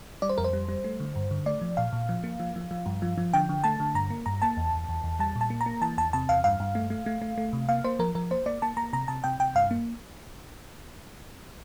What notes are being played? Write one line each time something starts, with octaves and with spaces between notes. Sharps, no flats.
G3 D5
C5
F2 A#4
C5
G3
G3
A3
D3
G2
D3
A3 D5
F3
A#2 F5
A#2
F3
A#3
F3
F3
F3
G2
F3
F3
D3 G5
D3
A3 A5
D3
G2 A#5
A#3
G2 A#5
A#3 A5
E2
E2
E2
E2
G3 A5
A#2
A5
A#3
A#5
A#3
E3 A5
E2 A5
C3 A5
E2 F5
G2 F5
G2
A3
A3
A3
A3
A3
C3
A#3 F5
A#3 C5
F3 A#4
F3 A#4
A#3 C5
A#3 D5
A#3 A5
A#3 A#5
C3 A#5
C3 A5
C3 G5
C3 G5
G2 F5
A#3